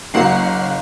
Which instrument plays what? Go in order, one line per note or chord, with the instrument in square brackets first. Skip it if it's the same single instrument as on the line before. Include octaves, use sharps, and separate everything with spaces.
[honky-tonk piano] F#1 A#3 [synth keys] F#3 F#5 C7